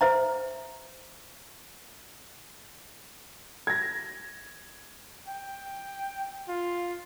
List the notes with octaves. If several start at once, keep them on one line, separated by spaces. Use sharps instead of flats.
C5 E5 A#5
G#6 A#6
G5
F4